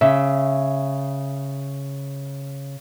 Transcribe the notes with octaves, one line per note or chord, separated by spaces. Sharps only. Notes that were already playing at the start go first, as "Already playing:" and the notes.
C#3 E5